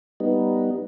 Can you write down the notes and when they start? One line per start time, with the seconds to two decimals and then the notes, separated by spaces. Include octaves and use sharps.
0.20 G3 B3 D#4